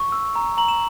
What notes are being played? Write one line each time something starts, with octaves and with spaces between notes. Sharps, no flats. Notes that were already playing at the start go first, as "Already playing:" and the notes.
Already playing: C#6
E6
A#5
A#5 F#7
E7